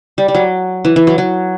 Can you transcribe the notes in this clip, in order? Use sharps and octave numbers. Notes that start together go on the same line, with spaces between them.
G3
G3
F#3
E3
E3
F#3
F#3